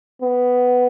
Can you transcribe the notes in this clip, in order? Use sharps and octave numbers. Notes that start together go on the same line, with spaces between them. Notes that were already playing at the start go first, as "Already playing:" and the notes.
B3